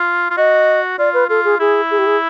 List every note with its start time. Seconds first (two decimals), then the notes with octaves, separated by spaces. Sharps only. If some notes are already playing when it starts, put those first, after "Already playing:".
Already playing: F4
0.30 F4
0.37 F#4 D#5
0.98 F4 D5
1.14 B4
1.29 F4 A4
1.44 G#4
1.60 E4 G#4
1.91 G#4
1.98 G4
2.06 G#4